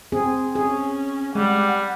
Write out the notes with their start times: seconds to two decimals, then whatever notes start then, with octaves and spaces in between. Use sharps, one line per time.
0.12 C4 G#4
0.55 C#4 G#4
1.35 G3 G#3 F#5